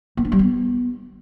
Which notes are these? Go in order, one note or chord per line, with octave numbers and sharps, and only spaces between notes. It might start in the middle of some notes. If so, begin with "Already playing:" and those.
A#3
D4
G3
B3